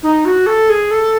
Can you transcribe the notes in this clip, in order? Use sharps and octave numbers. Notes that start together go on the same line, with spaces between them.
D#4
F#4
A4
G#4
A4